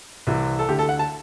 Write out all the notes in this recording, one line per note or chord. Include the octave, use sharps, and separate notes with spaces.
C2 C3 E3
A4
D2 D3 G4
A4
F#5
A5